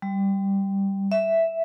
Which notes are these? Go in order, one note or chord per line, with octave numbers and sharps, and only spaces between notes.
G3
E5